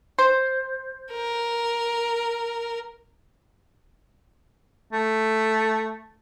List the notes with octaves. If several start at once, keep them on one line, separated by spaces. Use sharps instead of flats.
C5
A#4
A3